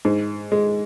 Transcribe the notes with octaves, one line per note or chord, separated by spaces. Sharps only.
G#2
G#3